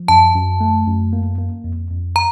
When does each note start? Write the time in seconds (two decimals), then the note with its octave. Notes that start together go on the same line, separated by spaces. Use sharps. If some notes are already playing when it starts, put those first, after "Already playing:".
Already playing: F3
0.08 F#2 A5
0.35 F#2
0.61 A3
0.87 F#2
1.13 A#3
1.38 A#3
1.64 F2
1.91 F2
2.16 A#5